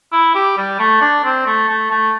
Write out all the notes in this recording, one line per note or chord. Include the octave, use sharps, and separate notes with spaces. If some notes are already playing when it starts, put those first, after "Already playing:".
E4
G4
G3
A3
D4
C4
A3
A3
A3